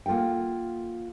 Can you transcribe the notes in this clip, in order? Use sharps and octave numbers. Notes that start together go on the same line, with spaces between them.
A#3 F4 A4 F#5 G5